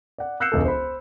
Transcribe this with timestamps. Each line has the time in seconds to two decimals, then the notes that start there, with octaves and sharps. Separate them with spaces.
0.18 D5 F#5
0.40 E6 F#6 G6 C7 C#7 E7
0.52 E1 C#2 A4
0.65 C5 B5